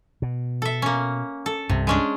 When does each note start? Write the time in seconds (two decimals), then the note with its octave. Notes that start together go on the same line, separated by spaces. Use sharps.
0.22 B2
0.62 A4 E5
0.82 A#3 C#4
1.46 A4
1.69 C2 G2 C3
1.87 G#3 C#4 D4